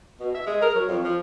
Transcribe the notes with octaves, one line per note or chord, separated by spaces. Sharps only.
B2
E5
G#3
A#4
F#3
F2
F3